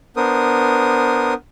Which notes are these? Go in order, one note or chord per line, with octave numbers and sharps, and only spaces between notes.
B3 D4 A#4 C5 D#6